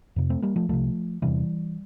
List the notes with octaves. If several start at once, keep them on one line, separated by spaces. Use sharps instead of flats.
F2 C3
A3 C4
G3 A#3
F3 A3
C2 C3 F3 A3
E2 C3 E3 G3